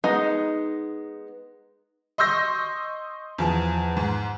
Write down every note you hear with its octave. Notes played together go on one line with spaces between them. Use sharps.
G#3 B3 D#4 D#5
D#5 C6 C#6 E6 G6 A#6
E2 F3
G#2